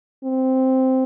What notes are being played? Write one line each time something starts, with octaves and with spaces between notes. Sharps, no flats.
C4